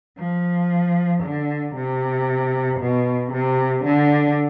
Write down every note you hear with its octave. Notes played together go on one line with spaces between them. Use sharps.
F3
D3
C3
B2
C3
D3